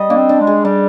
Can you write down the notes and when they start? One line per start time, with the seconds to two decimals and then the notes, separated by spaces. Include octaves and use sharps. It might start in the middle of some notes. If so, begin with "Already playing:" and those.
Already playing: G3 D#5
0.09 A#3 D4
0.16 C4
0.29 D4
0.40 G#3
0.47 G#4
0.64 G3 D4